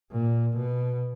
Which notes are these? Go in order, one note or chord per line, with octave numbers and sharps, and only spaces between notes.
A#2
B2